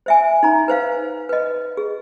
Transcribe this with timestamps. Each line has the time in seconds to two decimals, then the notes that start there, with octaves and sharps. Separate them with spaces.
0.06 C5 E5 G#5
0.43 D#4 A#5
0.68 B4 C5 F5
1.29 B4 D#5
1.77 G#4